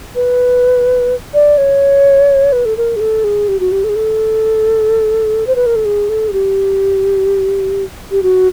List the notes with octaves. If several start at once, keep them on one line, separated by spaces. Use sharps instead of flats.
B4
D5
C#5
B4
A4
A#4
G#4
A4
G#4
G4
F#4
G4
A4
G#4
A4
C5
B4
A#4
A4
G#4
A4
G#4
G4
G4
F#4